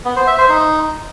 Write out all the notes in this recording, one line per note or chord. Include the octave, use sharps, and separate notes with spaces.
B3
C5
E5
C5
D#4